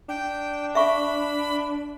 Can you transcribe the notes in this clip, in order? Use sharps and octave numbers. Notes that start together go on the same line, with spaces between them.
D4 G5
E5 F5 B5 C#6